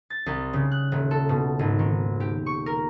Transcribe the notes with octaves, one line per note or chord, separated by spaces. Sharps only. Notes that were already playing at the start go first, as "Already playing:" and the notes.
A6
C2
C#3
F#6
D#1
A4
B2
G#1
D#3
G4
C#6
A#4